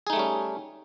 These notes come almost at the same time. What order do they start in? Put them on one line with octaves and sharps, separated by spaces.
G#4 D#4 A3 G3 C#4